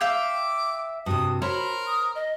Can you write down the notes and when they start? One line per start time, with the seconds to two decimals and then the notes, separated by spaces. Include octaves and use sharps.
0.01 E5 F5 G5 D6
1.06 G2 C3 F#4 D#6
1.42 A#4 C5 C#5 B5
1.86 D#6
2.15 D#5